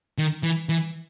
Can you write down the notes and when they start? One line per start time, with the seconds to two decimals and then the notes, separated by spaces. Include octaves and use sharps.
0.18 D#3
0.43 E3
0.69 E3